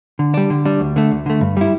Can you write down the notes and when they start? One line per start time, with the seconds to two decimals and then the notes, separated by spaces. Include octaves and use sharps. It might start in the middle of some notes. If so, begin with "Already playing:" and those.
0.19 D3
0.34 G3 D4
0.50 D3
0.65 G3 D4
0.80 D2
0.96 D3 A3
1.11 D2
1.26 D3 A3
1.41 G2
1.57 G3 E4